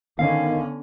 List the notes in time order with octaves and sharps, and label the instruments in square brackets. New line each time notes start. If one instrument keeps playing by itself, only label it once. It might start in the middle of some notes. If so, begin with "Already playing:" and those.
[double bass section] D3 B3 C#4 [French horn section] D#3 [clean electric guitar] F5